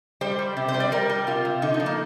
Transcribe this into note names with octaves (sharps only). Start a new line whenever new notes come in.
G3 C5
G3
C3
C5
G3
D5
G3 A#4
G3
C3 F4
C3
D3 D#4
D#4
F3
A#3